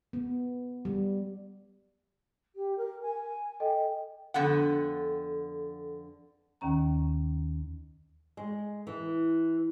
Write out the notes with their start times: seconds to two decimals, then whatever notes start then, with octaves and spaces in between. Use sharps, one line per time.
0.13 B3
0.85 G3
2.56 G4
2.77 A#4
3.02 G#5
3.60 A4 D#5 G5
4.34 F2 D3 B3 F#5
6.61 D#2 D#3 C#4 A#5
8.37 G#3
8.87 E3